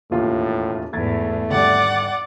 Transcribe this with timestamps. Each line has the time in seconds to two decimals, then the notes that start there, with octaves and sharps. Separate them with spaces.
0.11 E1 D#2 A2 F4
0.93 E2 G#2 A3 G#6 A6
1.50 G#1 D3 G3 D5 F#5 D6